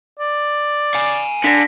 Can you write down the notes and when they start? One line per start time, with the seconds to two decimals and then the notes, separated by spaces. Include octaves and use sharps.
0.19 D5
0.94 F5 G#5
1.44 D3 A#6 B6